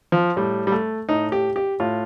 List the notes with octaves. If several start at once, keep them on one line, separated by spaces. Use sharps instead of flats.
F3
A2 G3
G3
A3
A2 D#4
G4
G4
A2 F4